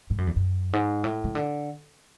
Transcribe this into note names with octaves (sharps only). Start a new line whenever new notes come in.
G#2
F#2
E2
F#2
G#2
A2
C#3
D3